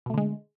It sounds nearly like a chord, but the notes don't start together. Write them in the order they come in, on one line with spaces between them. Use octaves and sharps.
B2 A3 D3 G#3